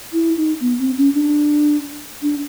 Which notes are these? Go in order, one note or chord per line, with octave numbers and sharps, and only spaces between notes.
E4
D#4
B3
C4
C#4
D4
D4